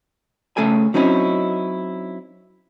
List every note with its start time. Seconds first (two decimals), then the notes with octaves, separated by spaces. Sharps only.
0.57 C#3 A3 A4 G5 G#5
0.94 F#3 C4 C#4 D#4 E4